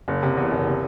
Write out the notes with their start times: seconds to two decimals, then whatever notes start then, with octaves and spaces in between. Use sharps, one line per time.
0.08 F#1
0.23 C3
0.37 E2
0.52 F#1
0.67 C3